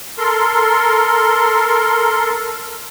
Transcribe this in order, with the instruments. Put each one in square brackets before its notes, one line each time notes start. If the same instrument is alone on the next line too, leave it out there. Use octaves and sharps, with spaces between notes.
[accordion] A4 A#4 C6